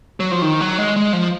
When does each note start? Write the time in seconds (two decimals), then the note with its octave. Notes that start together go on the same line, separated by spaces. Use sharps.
0.20 F#3
0.31 F3
0.42 D#3
0.61 F#3
0.78 G#3
0.96 G#3
1.13 F3